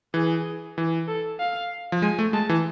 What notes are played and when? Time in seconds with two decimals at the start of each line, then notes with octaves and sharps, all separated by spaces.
0.14 E3 G#4
0.78 E3
1.08 A4
1.40 F5
1.92 F3
2.02 G#3 G#5
2.19 A3
2.33 G#3 A5
2.49 E3